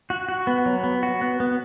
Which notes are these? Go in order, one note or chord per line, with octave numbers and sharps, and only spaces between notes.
F#4
F#4
B3
F#3
B3
F#4
B3
B3